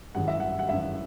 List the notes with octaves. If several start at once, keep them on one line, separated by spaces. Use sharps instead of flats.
G#1 F#2 E3 G#3 F#5
E5
F#5
F#5
G#1 F#2 E3 G#3 E5